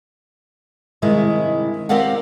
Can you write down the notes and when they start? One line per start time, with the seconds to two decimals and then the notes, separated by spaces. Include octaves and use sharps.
1.02 G2 C3 D#3 G#3 E4
1.89 C4 G4 A#4 D5 F5 F#5